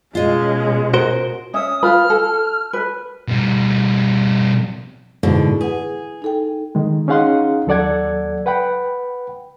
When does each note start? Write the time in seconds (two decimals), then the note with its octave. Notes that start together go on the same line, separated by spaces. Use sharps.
0.15 B2 G#3 C#4 F4 D#5
0.94 F#4 A#4 C5
1.54 C#4 E5 D#6
1.83 F4 B4 B5 F6
2.10 A4
2.73 B4
3.28 B2 G3
5.23 G#2 B2 D3 E4 G#4
5.61 G#4 B4 F#5
6.22 D#4 A4 G5
6.75 D#3 G#3
7.08 C#4 D#4 G#4 F5 F#5 C6
7.67 D#2 F#3 A4 D5 F#5 G#6
8.46 B4 F#5 G5 B5